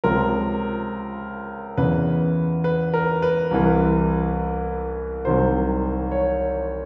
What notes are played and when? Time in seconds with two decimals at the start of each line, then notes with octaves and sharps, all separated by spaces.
0.04 C#2 C3 F3 A#4
1.77 E2 C#3 E3 B4
2.64 B4
2.94 A#4
3.22 B4
3.51 C2 C3 E3
5.25 C2 C3 D#3 F#3 C5
6.11 C#5